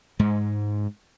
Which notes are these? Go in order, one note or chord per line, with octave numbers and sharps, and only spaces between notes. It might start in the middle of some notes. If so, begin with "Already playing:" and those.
G#2 G#3